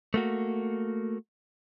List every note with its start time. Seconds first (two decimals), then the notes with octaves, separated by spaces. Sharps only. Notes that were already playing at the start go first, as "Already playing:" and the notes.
0.14 A3 A#3 F#4